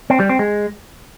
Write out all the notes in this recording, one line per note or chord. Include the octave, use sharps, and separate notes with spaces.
C4
G3
C4
G#3